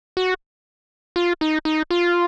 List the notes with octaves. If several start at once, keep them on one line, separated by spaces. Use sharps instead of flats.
F#4
F4
D#4
D#4
F4